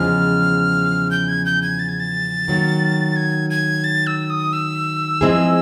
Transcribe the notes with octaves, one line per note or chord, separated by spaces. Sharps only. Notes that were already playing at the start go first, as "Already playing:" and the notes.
Already playing: E2 C#3 F3 G#3 C#4 F6
G6
G#6
G6
G#6
A6
G#6
A6
D#3 F#3 A#3
G#6
G#6
A6
E6
D#6
E6
F3 G#3 C4 E4 G#4